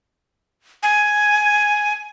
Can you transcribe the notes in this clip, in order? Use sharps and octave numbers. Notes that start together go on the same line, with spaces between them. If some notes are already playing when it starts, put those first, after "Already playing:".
G#5